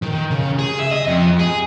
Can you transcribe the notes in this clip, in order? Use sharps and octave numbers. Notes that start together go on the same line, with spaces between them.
D#3
C#3
G#4
E5
D#5
F2
G#4